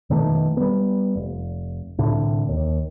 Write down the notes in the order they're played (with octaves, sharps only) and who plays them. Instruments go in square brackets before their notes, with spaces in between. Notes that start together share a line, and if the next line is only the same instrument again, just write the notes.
[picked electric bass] F2 B2 D#3 A3
G3 B3
F1
C2 A2 D3
D#2